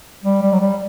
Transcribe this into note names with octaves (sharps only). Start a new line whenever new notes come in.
G3
G3
F#3
G3